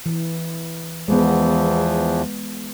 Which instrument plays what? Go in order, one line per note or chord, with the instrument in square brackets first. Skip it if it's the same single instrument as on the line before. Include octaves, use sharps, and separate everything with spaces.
[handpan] E3
[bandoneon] E2 E3 F3 [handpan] G#3 B3